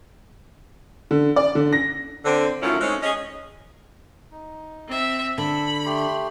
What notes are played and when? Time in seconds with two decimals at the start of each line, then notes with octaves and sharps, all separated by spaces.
1.11 D3
1.36 D5
1.55 D3
1.73 A#6
2.24 D3 C4
2.62 F#2 D#3 A3 C#4 E4 F4
2.80 G#3 A3 C4 C#4 D#4
3.02 C#4 G#4 C#5 D#5
4.31 D#4
4.88 C4 E5
5.38 D3 A4 B5
5.86 A3 G4 C6